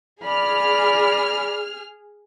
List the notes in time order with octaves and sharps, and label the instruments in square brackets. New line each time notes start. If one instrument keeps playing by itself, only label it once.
[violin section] G#4 F6 [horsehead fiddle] D5 B5